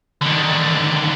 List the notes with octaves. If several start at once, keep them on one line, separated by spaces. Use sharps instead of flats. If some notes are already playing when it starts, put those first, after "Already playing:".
D3 D#3